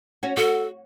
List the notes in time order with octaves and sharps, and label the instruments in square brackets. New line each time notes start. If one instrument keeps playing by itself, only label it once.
[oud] C#4 F#4
[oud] F#4 [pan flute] A4